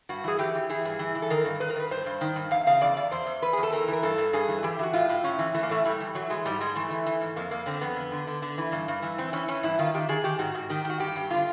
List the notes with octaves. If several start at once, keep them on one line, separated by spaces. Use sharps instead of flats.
G2 F#4
E3 G#4
E3 G4
E3
E3 G#4
G2
E3
E3
A4
D#3 A#4
G2
D#3 B4
A#4
D#3 B4
G2 C5
G2
D#3
G2
E2 F5
C#3 F5
E2 D5
E2 D5
E2 C5
E2
E2 B4
E2 G#4
A4
E3 A#4
E3 A#4
G2 A4
G2
G2 G#4
E3
E3 G4
E3 F#4
A2 F4
A2
A2 C#4
E3
E3 A3
A#3
A2 A3
A2 G3
E3
E3 F#3
E3 G#3
G#2 G3
G#2 G#3
E3 A3
E3
E3
G#2
F2 A#3
F2 A#3
D3 C4
F2 B3
F2
D3
D3
D3
E3
G2
G2
E3
E3 C4
E3 C#4
E3 C#4
G2 E4
D#3 F4
D#3 G4
D#3 G#4
D#3 G4
G#2 F#4
G#2
D#3 G4
D#3 F#4
G2 G4
G2
D3 F4